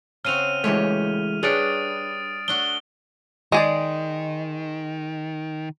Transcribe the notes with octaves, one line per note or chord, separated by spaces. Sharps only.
C#3 C4 F#4 F6 D#7 F7
E3 G#3 A3 G4 C#5
G3 D4 G#4 B4 C#5 D#6 A6 D7
A3 D4 F#4 G7
D#3 G#3 G#4 D5